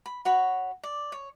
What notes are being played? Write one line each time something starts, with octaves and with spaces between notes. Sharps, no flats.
B5
F#4 C#5 B5
D5
C#5